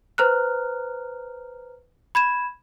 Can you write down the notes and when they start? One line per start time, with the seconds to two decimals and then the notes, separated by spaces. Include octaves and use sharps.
0.18 B4 C5 A#5 F6 F#6
2.15 B5 G#6 E7